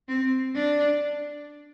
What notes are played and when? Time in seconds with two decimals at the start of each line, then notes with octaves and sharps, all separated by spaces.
0.08 C4
0.55 D4